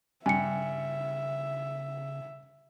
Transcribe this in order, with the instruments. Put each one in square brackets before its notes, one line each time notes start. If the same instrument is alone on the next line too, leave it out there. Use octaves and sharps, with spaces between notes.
[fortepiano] G2 [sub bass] C#3 [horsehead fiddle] E5 [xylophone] G#5 C#7